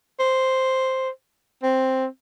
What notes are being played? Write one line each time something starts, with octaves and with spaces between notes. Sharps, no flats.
C5
C4